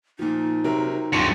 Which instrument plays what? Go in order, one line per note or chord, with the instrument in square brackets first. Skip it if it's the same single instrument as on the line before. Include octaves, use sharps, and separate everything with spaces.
[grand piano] A#2 F3 [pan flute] D#4
[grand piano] C3 F#3 A#4
[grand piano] D1 C#6 C#7 [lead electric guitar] G2 F3